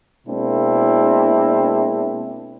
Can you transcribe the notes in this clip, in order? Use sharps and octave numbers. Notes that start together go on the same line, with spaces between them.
B2 G#3 A#3 C4 D4 E4